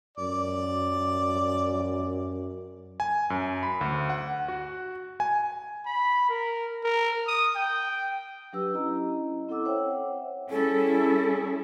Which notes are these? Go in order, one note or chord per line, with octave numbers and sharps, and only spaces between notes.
F#2 D5
G#5
F#2
B5
D2
F#5
F#4
G#5
B5
A#4
A#4
D#6
G5
F#3 D4 G4 B4 E6
C#4 E4 D#5 A#5
C4 E4 A4 F#5 D6 E6
C5 C#5 E5 F#5 G5
G3 C#4 E4 G#4 A4